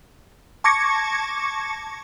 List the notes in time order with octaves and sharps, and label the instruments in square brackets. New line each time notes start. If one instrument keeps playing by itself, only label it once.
[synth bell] A5 C#6 D6 G#6 A#6 C#7